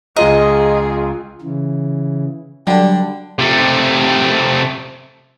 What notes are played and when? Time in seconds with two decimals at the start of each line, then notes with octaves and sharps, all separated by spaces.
0.16 C#2 F4 G#4 D#5 A#5
1.42 C#3 E3
2.67 D3 F#3 G3 D4 G4
3.39 C3 A3